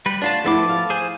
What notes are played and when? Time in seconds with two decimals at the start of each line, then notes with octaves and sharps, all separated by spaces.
0.06 G3 B4
0.22 D2 D4 F4 A5
0.44 F3 A3 B3 E4 A4 D6
0.69 F5
0.90 G#4 C5 G#5